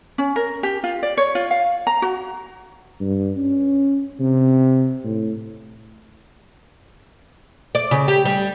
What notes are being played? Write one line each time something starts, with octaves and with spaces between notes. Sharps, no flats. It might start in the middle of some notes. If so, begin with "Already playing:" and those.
C#4
A#4
G4
F4
D5
C#5
F4
F5
A#5
F#4
G2
C#4
C3
A2
D5
C#3
G4
G3